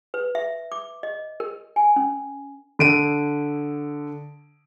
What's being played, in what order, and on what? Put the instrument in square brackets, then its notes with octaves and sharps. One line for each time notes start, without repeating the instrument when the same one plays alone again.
[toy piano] B4
E5
D6
D#5
A#4
G#5
C#4
[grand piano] D3 D7 D#7